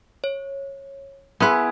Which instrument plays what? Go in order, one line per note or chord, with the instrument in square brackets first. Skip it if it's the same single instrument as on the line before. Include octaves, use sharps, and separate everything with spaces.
[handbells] C#5
[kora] B3 B4 [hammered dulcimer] E4 G#4 [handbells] F#5 C6